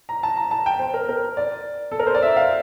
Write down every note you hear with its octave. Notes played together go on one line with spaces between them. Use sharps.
A#5
A5
A#5
A5
G5
C5
A#4
A#4
D5
A4
A#4
C5
D5
E5
F5